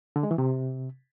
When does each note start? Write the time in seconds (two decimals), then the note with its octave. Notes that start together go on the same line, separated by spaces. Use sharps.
0.16 D3
0.23 G#3
0.31 E3
0.38 C3